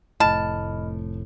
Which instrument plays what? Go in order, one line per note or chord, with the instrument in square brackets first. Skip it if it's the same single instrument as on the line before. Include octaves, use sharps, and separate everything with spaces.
[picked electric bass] F1 A2 [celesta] D#5 B5 F6 [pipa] A5